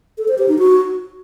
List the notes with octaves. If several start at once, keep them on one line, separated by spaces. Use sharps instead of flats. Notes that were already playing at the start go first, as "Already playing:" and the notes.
A4
C5
G4
D#4
F#4